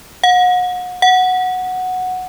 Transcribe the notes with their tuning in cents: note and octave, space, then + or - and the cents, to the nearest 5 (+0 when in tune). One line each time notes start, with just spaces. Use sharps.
F#5 -35
F#5 -5